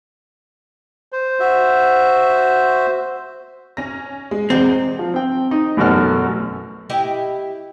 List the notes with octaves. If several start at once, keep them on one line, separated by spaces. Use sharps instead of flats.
C5
F#4 E5
C#4 A#6
G#3
E2 G#3 C4
F3
C4 G5
D#4
A1 F#2 B2 F#4 A4 F6
E4 G4 D#5